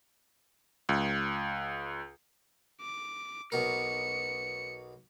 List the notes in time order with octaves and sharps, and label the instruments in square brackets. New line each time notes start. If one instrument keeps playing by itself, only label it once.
[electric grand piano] C#2
[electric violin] D6
[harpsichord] B1 B2 A#4 [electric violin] C#7